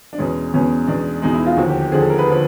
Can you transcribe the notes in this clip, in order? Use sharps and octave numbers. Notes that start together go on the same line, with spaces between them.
D4
E2 B2 G#3 C#4
E2 B2 G#3 C#4
E2 B2 G#3 D4
E2 B2 G#3 D#4
E4
F4
D#2 D3 F3 F#4
G4
G4
D#2 D3 F3 G#4
A4
A#4
B4
D3 F3